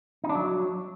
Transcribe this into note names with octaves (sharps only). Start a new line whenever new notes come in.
D#4
D4
F#3